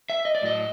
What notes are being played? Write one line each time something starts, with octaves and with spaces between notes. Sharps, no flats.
E5
D#5
D5
A2 F#3 D#5